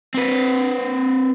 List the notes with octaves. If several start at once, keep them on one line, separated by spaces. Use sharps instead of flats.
C4 B4